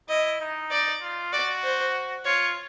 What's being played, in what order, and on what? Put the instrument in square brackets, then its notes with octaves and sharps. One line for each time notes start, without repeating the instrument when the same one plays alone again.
[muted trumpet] E4 [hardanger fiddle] D#5
[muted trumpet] D#4
[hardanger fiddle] D5
[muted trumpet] F4
[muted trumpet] F#4 [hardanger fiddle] D5
[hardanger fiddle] C5
[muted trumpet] F4 [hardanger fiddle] C#5